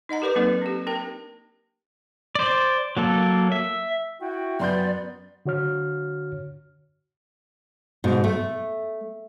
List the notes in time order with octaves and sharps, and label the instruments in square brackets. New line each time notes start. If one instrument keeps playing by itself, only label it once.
[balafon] D#4 D#5 F#5 A#5
G4 A#4 B4 D5 D6
F#3 A#3 C4 D#4 A4 B4
D4 G4
D4 A#4 G5
[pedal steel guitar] C5 D5
F#3 A#3 A4
E5
[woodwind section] E4 G5 [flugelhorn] F#4
[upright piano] F#2 C6 G6 [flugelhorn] B3 [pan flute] D5
[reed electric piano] D3 F#4 C#5 F6
[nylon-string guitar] G#2 B2
A3